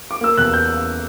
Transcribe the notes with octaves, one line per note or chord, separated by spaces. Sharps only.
D6
A#3 E6
E2 F#6
G6